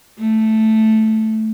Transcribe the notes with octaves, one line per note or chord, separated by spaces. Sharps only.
A3